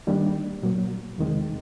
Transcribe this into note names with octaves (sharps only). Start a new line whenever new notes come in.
D#3 G3 A#3 D4
A#2 F#3 A#3
E2 C3 D#3 G#3